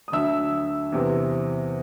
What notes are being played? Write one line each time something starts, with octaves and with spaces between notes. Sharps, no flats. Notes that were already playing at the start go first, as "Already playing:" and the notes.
D#6
D2 D3 F#3 E5 E6
E2 C3 E3